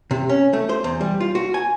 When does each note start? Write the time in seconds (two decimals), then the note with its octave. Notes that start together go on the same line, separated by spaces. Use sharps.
0.11 C3
0.30 C#4
0.53 A3
0.69 C5
0.84 E2
1.01 G3
1.20 F4
1.35 F#4
1.54 G#5